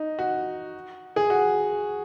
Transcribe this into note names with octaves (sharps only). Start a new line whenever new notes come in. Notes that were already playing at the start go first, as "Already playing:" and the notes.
Already playing: D#4
F#4
G#4
F#4